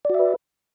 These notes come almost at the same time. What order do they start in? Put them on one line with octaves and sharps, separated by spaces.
D5 F#4 E5 B4